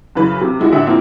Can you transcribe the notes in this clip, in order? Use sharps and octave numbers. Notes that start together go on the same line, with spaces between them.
F#2 C#3 E3 B4
C3
F3 G#3 E4 F#4
A1 D3 E5 F#5 G5
F3 A#3 C4 E4